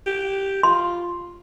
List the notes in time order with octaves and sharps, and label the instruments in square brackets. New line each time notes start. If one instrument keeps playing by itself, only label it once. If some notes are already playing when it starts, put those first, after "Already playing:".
[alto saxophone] G4
[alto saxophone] F4 [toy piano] C6